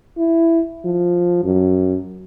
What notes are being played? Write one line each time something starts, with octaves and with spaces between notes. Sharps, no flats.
E4
F3
F#2